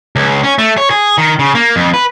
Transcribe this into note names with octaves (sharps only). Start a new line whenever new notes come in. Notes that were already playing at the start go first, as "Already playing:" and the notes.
C#2
C#4
A3
C#5
G#4
D#3
C#3
A#3
F2
B4